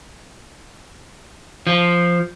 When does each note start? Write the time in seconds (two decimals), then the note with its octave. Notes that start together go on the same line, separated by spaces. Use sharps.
1.67 F3